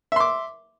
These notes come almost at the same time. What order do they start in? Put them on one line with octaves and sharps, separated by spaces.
E5 C6 D6